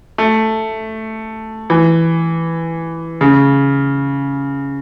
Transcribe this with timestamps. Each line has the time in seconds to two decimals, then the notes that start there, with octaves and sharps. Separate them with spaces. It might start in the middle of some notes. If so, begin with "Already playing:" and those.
0.18 A3
1.70 E3
3.21 C#3